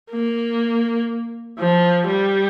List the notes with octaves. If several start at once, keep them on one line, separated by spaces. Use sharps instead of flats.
A#3
F3
G3